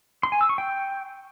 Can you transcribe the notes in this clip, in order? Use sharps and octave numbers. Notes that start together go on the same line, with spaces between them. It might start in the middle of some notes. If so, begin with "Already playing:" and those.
C6
G#5
E6
C#6
G5